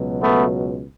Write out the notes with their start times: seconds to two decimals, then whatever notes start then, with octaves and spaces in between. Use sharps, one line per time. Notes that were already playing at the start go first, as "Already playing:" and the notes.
Already playing: C#2 B2 F#3
0.21 A3 B3